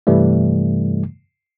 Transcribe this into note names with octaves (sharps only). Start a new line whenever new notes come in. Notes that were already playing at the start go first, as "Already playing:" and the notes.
G2 C3 E3 G3 A3